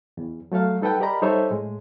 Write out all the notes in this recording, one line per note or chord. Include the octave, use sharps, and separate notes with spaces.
E2
F#3 A3 A4 F5
G3 D#4 A4 B4 F#5 G5
G4 A#4 D5 D#5 A#5 B5
G3 D#4 A4 C5 C#5 E5
A2 G#3